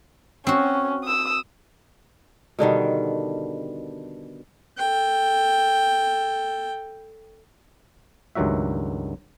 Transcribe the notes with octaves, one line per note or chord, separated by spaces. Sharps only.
C4 C#4 F#4
D#6 E6
B2 D3 D#3 G3
A4 G5
C#2 G2 D#3 F#3 F#4 E5